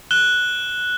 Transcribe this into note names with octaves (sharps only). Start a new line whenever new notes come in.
F#6 E7 G7